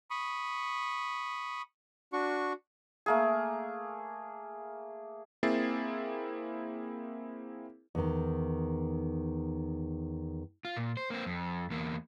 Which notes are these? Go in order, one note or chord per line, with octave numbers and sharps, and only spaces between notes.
B5 C#6 D#6
D4 F#4 C#6
A3 A#3 G#4
A#3 C4 E4 G#4 A6 C7
E2 D#3
F4
A#2
C5
A#3 C4
F2
E2 A#3